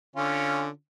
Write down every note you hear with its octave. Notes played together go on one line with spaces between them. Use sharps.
D3 C#4 F4